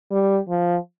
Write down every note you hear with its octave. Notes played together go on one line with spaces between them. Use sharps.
G3
F3